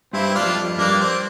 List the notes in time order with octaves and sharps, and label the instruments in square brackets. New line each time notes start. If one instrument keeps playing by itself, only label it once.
[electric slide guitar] G2 [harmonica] C4 E4
[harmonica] D4 F4
[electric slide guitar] G2
F2
[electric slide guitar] G2 [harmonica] A#3 D4
[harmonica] C4